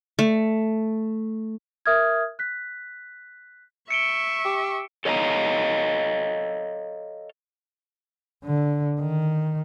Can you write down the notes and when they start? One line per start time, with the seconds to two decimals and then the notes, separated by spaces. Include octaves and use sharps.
0.19 A3
1.86 A#4 E5 D#6 F6 G#6
2.39 F#6 B6
3.91 E5 C#6 C#7 D7 G7
4.45 G4
5.05 A4 C#5 D#5 F5 G#5 A#5
8.44 D3
8.99 D#3